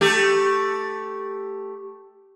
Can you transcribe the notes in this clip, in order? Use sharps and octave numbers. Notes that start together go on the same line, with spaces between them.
A3 G4